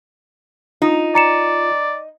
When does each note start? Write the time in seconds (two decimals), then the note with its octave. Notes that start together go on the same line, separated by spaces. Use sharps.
0.82 D#4 F4
1.15 D5 A#5 C#7 E7